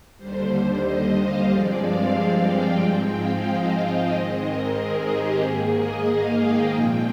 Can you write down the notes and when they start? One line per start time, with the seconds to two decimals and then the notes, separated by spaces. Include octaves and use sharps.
0.18 D#2 D3 G3 C5
0.84 D#5
1.16 F5
1.49 G2 F3 G#3 C4 D5
1.82 F5
2.14 F5
2.47 G5
2.80 G#2 F3 G#3 C4 G5
3.13 F5
3.46 D#5
3.78 D#5
4.11 G#2 D#3 G#3 C4 D#5
4.43 A#4
4.76 G#4
5.09 G4
5.42 G#2 D#3 A#3 G#4
5.74 D#5
6.07 F5
6.40 G5
6.72 A#2 F3 G#3 C4 G5